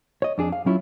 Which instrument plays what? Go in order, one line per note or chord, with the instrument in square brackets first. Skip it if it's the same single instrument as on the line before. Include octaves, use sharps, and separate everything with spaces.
[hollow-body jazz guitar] C#5 D#5
F2 D4 G#4
F5
F#3 C#4 E4 F4